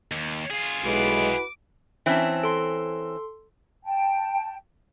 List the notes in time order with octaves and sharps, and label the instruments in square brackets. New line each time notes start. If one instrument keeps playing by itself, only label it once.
[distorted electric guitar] D#2
F4 G#4
[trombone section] B1 G#3 [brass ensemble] E4 F#4 B4 [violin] D6
[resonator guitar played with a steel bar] E3 C4 C#4 [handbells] E5 A5
[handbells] A4 C6
[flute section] G5 A5